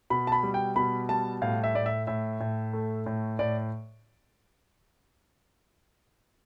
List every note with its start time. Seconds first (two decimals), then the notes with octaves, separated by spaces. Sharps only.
0.10 B2 B5
0.27 A5
0.32 B5
0.43 G3
0.54 G5
0.76 B2 B5
1.09 G3 A5
1.42 A2 F5
1.64 E5
1.75 A2 D5
1.86 E5
2.07 A2 E5
2.40 A2
2.73 A3
3.06 A2
3.39 A2 D5